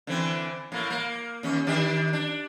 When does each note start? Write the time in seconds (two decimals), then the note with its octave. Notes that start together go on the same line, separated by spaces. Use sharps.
0.07 D3 E3 C4
0.72 A2 A#3
0.90 A#3
1.43 D#2 C#4
1.67 D#3 D4 G4
2.13 D4